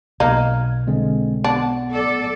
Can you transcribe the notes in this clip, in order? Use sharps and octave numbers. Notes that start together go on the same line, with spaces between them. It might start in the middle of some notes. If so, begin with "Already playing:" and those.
B1 A#3 D#4 F6 G#6
D3 G#3 C4
B3 D4 F#5
A4 D5